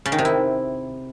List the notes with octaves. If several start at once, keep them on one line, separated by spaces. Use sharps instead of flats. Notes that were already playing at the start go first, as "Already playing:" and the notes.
C#3
D#3
C3
E4